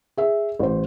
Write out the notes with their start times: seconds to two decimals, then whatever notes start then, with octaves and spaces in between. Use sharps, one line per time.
0.17 G#4 E5
0.59 A1 C5